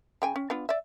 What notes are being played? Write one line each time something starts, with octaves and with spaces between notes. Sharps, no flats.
C#3 G5 G#5
C#4
B3 D4 F4
D5 E5